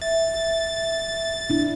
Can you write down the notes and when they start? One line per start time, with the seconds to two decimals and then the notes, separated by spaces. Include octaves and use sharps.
0.02 E5 A6
1.50 D4 E4